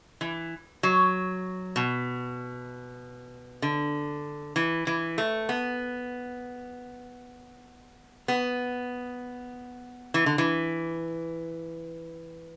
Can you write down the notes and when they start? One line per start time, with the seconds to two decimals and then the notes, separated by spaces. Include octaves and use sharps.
0.21 E3
0.83 F#3
1.76 B2
3.62 D3
4.56 E3
4.87 E3
5.18 A3
5.49 B3
8.28 B3
10.14 E3
10.26 D3
10.38 E3